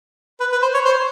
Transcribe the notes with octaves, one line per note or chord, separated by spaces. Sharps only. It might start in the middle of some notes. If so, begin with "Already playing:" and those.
B4
B4
C5
C#5
C5